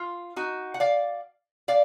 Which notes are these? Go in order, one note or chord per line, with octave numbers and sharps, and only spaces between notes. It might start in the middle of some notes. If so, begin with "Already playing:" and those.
Already playing: F4
D#4 F#4
F#5
D5 F5
D5 F5